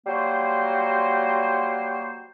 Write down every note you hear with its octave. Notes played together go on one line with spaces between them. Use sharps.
F#3 G3 A#3 F#4 C5